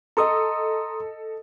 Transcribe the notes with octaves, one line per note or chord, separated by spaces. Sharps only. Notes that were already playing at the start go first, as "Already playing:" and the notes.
A4 D#5 A#5 C6 D#6